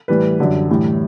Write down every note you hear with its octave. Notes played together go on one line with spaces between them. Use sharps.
A2 E3 G3 B4
F#2 D3 G3
A2 E3 G3